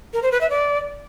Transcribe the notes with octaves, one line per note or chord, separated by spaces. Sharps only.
A#4
C5
B4
E5
D5